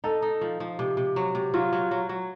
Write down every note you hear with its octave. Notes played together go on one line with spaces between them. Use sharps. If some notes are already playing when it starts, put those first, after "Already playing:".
D#4 A4
D#4
F3
F3
C3
C3
F#3
C3
F#3 F4
F#3
F#3
F#3